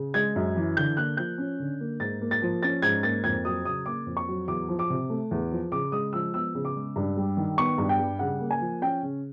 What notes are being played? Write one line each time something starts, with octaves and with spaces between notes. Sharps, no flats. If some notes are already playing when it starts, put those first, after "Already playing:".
Already playing: C#3
G#3 G#6
F#2
E3
D3 G6
A#3 F#6
F3 G6
C#4
D3
A#3
G#2 A6
A#3
A6
F3
C#4 A6
G#2 G#6
A#3 A6
F2 G#6
F#3 D#6
C#3 D#6
A#3 D6
F2
C#6
F#3
E2 D6
F3
D6
C3
A3
E2
F3
C#3 D6
G#3 D#6
F3 E6
B3 E6
C#3
D6
G#3
G2
G3
D#3
B3 C#6
G2
G5
G3
C#3 F#5
A#3
G#5
F3
C#4 G5
C#3